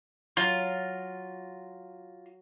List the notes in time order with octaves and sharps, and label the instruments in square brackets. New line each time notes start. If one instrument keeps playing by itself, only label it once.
[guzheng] F#3 [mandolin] F4